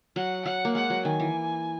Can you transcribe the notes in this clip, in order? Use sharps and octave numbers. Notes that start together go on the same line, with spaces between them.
F#3 F#5
F#3 F#5
A#3
G#3 F#5
F#3
D#3 G#5
E3